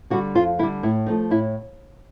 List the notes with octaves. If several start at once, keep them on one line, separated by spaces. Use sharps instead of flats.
D3 G3 F#4
F2 F4
D3 G3 E4
A2 E4
F3 A3 D#4
A2 E4